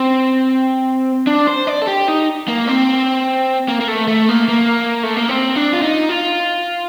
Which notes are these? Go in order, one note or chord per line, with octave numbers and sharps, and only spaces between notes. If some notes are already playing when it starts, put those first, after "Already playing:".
Already playing: C4
D4
C5
D5
A4
G4
D#4
A#3
C4
A#3
A#3
A3
A3
A#3
A#3
A3
A#3
C4
D4
F4
D#4
F4